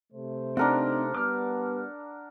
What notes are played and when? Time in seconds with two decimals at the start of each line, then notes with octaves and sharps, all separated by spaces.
0.12 C3 A3 C5
0.57 C4 D4 D#4 A#4 F#5
1.15 G3 B3 D6 F6